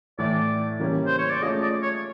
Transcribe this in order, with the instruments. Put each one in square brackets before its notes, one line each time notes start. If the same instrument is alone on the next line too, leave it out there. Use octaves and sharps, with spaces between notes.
[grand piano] A2 E3 A3 [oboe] D5
[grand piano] C#3 E3 G3 A#3 C#4
[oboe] C5
C#5
D5
[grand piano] A3 C#4 F4 G#4 [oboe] D#5
[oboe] D5
C#5